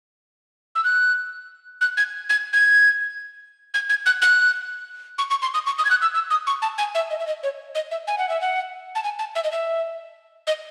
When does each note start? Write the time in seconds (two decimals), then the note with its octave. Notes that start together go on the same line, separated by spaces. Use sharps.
0.75 E6
0.84 F#6
1.81 F#6
1.97 G#6
2.30 G#6
2.53 G#6
3.74 G#6
3.90 G#6
4.06 F#6
4.22 F#6
5.18 C#6
5.30 C#6
5.42 C6
5.54 D#6
5.66 C#6
5.78 D#6
5.85 G#6
5.90 F#6
6.02 E6
6.14 E6
6.30 D#6
6.47 C#6
6.62 A5
6.78 G#5
6.95 E5
7.10 D#5
7.20 E5
7.27 D#5
7.43 C#5
7.75 D#5
7.91 E5
8.07 G#5
8.18 F#5
8.29 E5
8.41 F#5
8.95 A5
9.04 G#5
9.19 A5
9.35 E5
9.44 D#5
9.52 E5
10.47 D#5